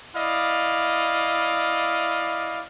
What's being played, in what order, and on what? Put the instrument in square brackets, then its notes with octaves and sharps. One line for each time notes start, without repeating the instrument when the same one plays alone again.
[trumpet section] E4 D5 D#5 F5